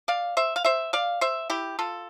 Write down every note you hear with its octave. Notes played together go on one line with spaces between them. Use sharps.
D5 F5
C5 E5
F5
C5 E5
D5 F5
C5 E5
E4 G4
F4 A4